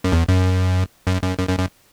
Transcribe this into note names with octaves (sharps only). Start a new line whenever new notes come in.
F#2
E2
F#2
F#2
F#2
F#2
F#2
F#2